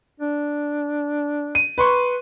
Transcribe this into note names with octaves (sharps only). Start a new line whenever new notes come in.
D4
D#7
B4 C6 C#6